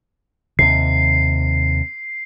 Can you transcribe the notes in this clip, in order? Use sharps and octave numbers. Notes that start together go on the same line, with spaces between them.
D#2 C3 C7